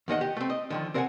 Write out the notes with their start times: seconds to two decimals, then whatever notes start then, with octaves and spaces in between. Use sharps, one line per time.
0.08 E2 D#3 D#5 F#5
0.21 G4
0.37 A3 C4
0.50 D#5
0.70 D3 D#3 F3
0.94 C4 A#4 D5 E5 F#5 G#5